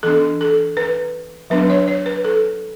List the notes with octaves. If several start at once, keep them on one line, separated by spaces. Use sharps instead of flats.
E3 B3 D4 A4
A4
B4
F#3 B3 D4 B4
C#5
C#5
B4
A4